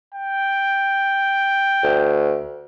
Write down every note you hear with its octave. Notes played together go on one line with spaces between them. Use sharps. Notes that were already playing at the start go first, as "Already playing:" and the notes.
G5
D2